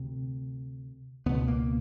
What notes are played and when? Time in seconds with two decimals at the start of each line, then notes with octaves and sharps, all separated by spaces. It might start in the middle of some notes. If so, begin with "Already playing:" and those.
Already playing: D2 C3 C4
1.26 C#2 B2 B3
1.48 A#3